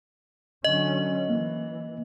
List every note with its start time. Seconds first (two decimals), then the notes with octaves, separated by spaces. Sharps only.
0.64 D3 F#3 C#4 D#5
1.30 E3 A#3